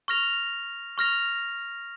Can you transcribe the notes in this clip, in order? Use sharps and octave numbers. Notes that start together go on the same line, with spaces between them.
C#6 F6 A#6 F7
C#6 F6 A#6 F7